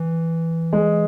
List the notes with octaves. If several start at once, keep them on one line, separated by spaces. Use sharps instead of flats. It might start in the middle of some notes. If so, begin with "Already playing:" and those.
Already playing: E3
G#3